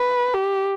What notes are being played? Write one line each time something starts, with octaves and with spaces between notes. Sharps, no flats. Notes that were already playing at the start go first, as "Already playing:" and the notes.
Already playing: B4
G4